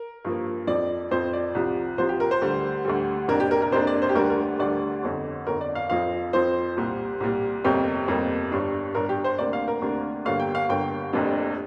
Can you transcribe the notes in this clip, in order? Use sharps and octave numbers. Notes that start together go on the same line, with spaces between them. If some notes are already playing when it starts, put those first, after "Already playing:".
Already playing: A#4
G2 F3 A#3
F2 F3 C4 D5
F2 F3 C4 C5
D5
C2 C3 F3
C2 C3 F3 C5
G4
A#4
C5
D2 D3 G3
D2 D3 G3
F2 C3 A#3 D4 A#4
G4
A#4
A#4
F2 C3 A#3 D4 C5
D5
C5
G4
D2 D3 G3 D4 A#4
A#4
D2 D3 G3 D4 D5
G1 F2 D3
G1 F2 D3 A#4
D5
F5
F2 F3 C4 F5
F2 F3 C4 C5
C2 A#2 G3
C2 A#2 G3
G1 F2 C3 G3 A#3 G4
G1 F2 C3 G3 A#3
G1 G2 G3 D4
G1 G2 G3 D4 A#4
G4
C5
D2 C3 A#3 D4 D5
F5
A#4
D2 C3 A#3 D4
G1 G2 D3 G3 A#3 F5
G5
F5
G1 G2 D3 G3 A#3 G5
F1 F2 C3 A#3 D4